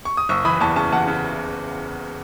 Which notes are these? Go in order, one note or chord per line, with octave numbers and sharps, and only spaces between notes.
C#6
D#6
F#1 C#6 E6
E3 B5 D#6
E2 A5 C#6
C#3 A5 C#6
E2 F#5 A5
C#3